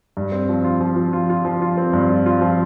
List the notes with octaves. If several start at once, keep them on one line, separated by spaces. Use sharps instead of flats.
G2
C4
F3
F4
F3
F3
F4
F4
F3
F4
C4
G2
F4
F4
F3